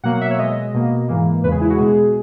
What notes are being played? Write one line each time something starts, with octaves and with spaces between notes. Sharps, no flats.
B2 F#3 A#3 F#5
E5
C#5
B2 G#3 D#5
B2 A#3
G#2 E3 A#3
E2 C#3 G#3 B4
G#4
E4
F#4
B2 G#3 G#4